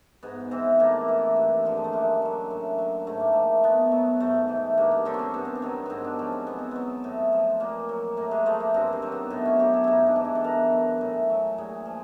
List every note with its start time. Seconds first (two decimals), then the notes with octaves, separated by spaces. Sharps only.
0.23 G#2 B3
0.51 E3 C4
0.80 A2 A#3
1.08 E3
1.36 G2
1.65 D3 F3
1.76 G#3
1.84 A3
1.93 F#2 A#3
2.22 D3 F#3
2.51 A2
2.78 F#3
3.07 G#2 A3
3.20 A#3
3.33 F3 A3
3.64 B2 B3
3.92 F#3
4.20 G#2 A3
4.48 E3
4.77 G2 A#3
4.91 B3
5.05 D3 F#3 C4
5.14 C#4
5.19 C4
5.34 G2 B3
5.45 C4
5.56 B3
5.62 D#3 F#3
5.86 G#2 B3 C4
6.04 D4
6.19 F3 C#4
6.32 C4
6.47 B2 B3
6.59 C4
6.71 F#3 B3
7.04 A2
7.33 F3
7.60 A#2 A#3
7.89 F#3
8.17 A2 A#3
8.31 G#3
8.46 F3 A3
8.60 A#3
8.74 G2 C4
8.93 C4
9.02 D#3 F#3
9.12 B3
9.30 A2 B3
9.45 C#4
9.59 F#3 G4
9.74 E4
9.84 G#2 D#4 E4
10.07 D4
10.16 E3
10.25 E4
10.35 A4
10.44 B2 A#4
10.72 F#3
11.01 A2 G#4
11.30 F#3
11.58 A#2 G#4
11.86 F3